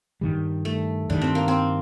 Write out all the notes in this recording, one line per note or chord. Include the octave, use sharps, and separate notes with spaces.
G2 D#3 G3
A3
G2 D#3 G3 D4
C4
A#3
C4